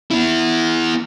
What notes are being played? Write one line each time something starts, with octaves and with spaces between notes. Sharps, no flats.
B3 E4